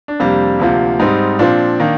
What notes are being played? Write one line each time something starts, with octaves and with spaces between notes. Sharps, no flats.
D4
F2 C3 G3 A#3
D2 C3 F3 A#3
G#2 G3 C4 D#4
A#2 F3 C4 D4
D#3 A#3